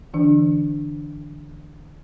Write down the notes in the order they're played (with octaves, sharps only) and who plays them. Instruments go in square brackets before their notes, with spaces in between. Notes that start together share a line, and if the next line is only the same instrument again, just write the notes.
[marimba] D3 E3 D4